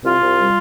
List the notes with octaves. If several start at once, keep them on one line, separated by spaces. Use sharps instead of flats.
C2 F4
C2
G3